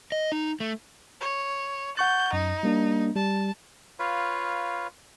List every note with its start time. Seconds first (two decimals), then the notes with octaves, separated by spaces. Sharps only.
0.12 D#5
0.32 D#4
0.60 A3
1.21 C#5
1.97 F#5 C#6 G6 A6
2.33 F#2 D#4
2.63 G3 A#3 D4
3.16 G3 A5
3.99 F4 B4 C#5 F5